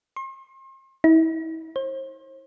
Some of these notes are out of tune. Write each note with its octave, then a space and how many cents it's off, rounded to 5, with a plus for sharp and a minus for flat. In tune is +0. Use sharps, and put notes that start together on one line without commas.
C6 +40
E4 -40
C5 +40